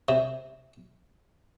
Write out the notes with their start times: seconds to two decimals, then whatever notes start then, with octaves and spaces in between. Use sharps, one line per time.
0.09 C3